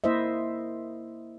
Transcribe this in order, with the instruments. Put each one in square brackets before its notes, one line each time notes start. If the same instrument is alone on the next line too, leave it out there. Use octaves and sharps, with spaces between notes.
[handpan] A#3 E4 C5 D#5 E5